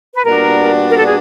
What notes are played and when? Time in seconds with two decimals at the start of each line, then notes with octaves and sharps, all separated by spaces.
0.14 B4
0.25 A#2 G3 B3 D4 F#4 A#4
0.90 A#4
0.97 A4
1.05 G#4